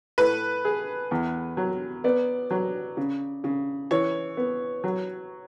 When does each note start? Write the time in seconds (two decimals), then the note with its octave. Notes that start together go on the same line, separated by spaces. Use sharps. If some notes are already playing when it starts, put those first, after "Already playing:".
0.18 A2 B4
0.65 G#4
1.11 E2
1.57 F#3
2.04 B3 D5
2.51 F#3
2.97 C#3
3.44 C#3
3.91 E3 C#5
4.37 B3
4.84 F#3